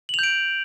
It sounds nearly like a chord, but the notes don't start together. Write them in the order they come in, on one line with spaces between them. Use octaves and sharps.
F#7 F7 G6 D7